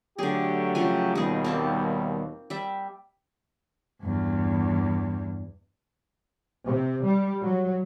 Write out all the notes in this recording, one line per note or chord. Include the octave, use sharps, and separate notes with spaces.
D3 F#3 A3 G4 G#4
C#3 F3 G#5
D#2 B2 G3 D#4 G#4
A#3 C4 A5
G3 E5
E2 G2
C3
G3
F#3